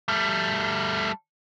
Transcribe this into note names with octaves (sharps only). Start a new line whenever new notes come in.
G3 A3